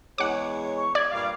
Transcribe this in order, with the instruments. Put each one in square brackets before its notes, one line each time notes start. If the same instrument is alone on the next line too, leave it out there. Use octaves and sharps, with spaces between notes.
[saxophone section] E2 G#3 C#5 [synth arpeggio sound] F#5 D6
[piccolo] C#6
[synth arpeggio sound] D5 [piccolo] G#6
[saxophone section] G2 A#2 F5 [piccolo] D6